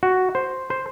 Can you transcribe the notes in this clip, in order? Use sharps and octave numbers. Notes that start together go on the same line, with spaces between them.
F#4
C5
C5